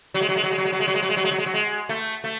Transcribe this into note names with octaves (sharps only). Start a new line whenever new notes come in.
F#3
G#3
F#3
G#3
F#3
G#3
F#3
G#3
F#3
G#3
F#3
G#3
F#3
G#3
F#3
G#3
F#3
G#3
F#3
G#3
A3
A3